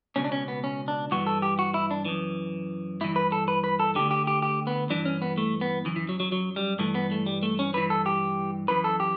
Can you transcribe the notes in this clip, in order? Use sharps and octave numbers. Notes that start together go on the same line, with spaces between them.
C#2 B2 C#4
D4
C#4
B3
C#4
D4
G2 E3 F#4
A4
G4
F#4
E4
D4
F#2 E3
G2 E3 E4
B4
A4
B4
B4
A4
D2 D3 G4
G4
G4
G4
B3
G2 E3 D4
C#4
B3
A3
B3
F#2 E3
E3
F#3
F#3
F#3
G3
G2 E3 A3
B3
A3
G3
A3
C#4
G2 E3 B4
A4
G4
F#2 E3 B4
A4
G4